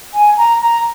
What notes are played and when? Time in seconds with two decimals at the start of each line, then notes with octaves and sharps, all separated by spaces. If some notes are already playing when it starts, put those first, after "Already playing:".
0.14 G#5
0.37 A#5
0.61 A#5